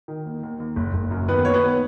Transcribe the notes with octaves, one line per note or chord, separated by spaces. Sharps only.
D#3
D#2
D#2
D#2
F#1
F#1
F#2
D#3 B3 B4
D#2 C#5
B3 B4